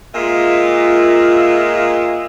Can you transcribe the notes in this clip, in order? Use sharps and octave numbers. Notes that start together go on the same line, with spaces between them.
A#2 G#3 F4 E5